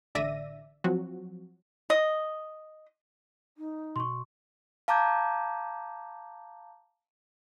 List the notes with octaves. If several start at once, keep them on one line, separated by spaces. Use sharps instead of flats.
A1 D3 D5 E5 A#6 D#7
F3 F#3 C4 F#4
D#5
D#4
B2 C6 C#6
F5 A5 A#5 D6 G6 G#6